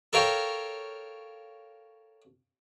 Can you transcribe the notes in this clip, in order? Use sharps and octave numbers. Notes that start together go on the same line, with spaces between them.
A4 A#4 C#5 F5 G5